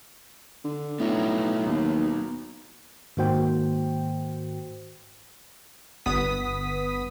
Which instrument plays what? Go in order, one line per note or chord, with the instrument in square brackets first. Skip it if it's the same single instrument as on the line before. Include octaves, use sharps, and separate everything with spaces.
[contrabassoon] D3
[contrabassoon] A2 [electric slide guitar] B3 D#4 F#4
[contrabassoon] D#2
[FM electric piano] G#2 D#3 A#3 F#4 C5 G5
[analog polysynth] G1 B3 D#6 B6